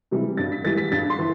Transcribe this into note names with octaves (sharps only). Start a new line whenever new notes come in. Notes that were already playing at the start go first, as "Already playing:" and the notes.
C3 E3 G3
G2 A6
B6
E3 G3 A6
B6
G2 A6
C6
E3